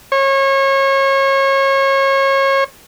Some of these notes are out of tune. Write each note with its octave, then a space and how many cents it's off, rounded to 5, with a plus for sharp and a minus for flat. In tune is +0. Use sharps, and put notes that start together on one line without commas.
C#5 -30